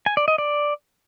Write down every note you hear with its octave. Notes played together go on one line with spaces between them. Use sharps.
G#5
D5
D#5
D5